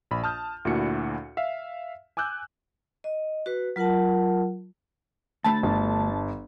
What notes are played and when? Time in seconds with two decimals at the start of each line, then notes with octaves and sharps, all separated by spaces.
0.11 A#1 B5
0.24 A5 D#6 F6 G6
0.65 D2 A#2 D4 E4 F#4 C#7
1.37 E5 F5
2.17 G#5 D6 E6 F#6 G6
3.04 D#5
3.46 F#4 B4
3.76 F#3 F4 A#4 F#5 A5
5.44 D2 A3 A5 B5
5.63 G1